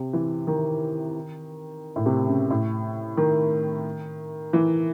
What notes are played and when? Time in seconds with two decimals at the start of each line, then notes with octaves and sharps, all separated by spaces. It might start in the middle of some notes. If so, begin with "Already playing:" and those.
Already playing: C3
0.13 E3
0.47 D#3
1.96 A2
2.06 C3
2.27 C#3
2.51 A2
3.17 D#3
4.53 E3